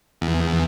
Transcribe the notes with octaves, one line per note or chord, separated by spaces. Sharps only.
E2